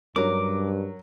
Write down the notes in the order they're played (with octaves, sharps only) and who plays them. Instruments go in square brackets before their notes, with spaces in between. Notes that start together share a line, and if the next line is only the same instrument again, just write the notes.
[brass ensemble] G2 [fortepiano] F#3 C#4 [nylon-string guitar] A#4 [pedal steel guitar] D6